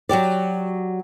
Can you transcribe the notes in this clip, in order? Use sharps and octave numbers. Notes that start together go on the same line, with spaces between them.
F#3 F#4 G4 D5